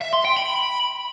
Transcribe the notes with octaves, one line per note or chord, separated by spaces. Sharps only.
E5
C6
G5
B5